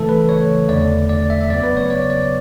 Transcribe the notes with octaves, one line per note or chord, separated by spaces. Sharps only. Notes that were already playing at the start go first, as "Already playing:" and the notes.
Already playing: C#3 E3 A3 A4
B4
C#5
E2 D3 A3 D5
D5
E5
E5
F#2 C#3 F#3 B3 D5
B4
C#5
D5
D5